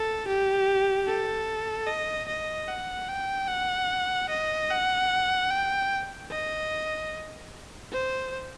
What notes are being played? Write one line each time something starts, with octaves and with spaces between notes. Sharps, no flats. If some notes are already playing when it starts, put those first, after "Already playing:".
Already playing: A4
G4
A4
D#5
D#5
F#5
G5
F#5
D#5
F#5
G5
D#5
C5